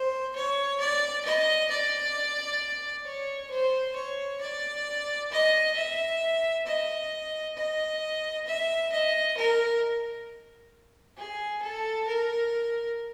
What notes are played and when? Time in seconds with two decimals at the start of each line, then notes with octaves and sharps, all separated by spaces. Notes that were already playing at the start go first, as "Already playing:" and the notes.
Already playing: C5
0.35 C#5
0.80 D5
1.25 D#5
1.70 D5
3.05 C#5
3.50 C5
3.96 C#5
4.41 D5
5.31 D#5
5.76 E5
6.66 D#5
7.57 D#5
8.47 E5
8.92 D#5
9.37 A#4
11.17 G#4
11.62 A4
12.07 A#4